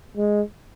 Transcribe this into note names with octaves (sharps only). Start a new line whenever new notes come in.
G#3